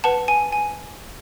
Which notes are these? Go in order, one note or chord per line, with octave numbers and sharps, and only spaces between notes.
B4 F#5 A5
G#5
G#5